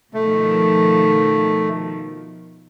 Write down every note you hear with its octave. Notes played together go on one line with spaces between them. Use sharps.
B2 D#3 F3 A3